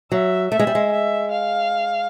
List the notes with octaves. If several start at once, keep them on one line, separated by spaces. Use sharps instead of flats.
F#3 E5
A3 E5
G#3
G3
G#3
E5
F5